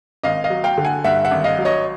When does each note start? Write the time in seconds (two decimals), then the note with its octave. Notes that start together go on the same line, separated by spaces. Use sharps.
0.23 G#1 D#5 F5
0.44 D#5 F5
0.50 F#3
0.64 F5 G5
0.78 D3
0.85 F#5 G#5
1.04 G2 E5 F#5
1.24 E5 F#5
1.31 G#1
1.44 D#5 F5
1.58 F#3
1.65 C#5 D#5